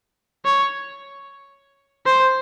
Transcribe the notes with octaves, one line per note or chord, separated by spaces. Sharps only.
C#5
C5